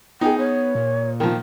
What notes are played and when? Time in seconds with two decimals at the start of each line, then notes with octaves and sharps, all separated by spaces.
0.21 B3 D#4 G#4 G5
0.39 B3 C#5
0.75 A#2
1.20 D#3 F3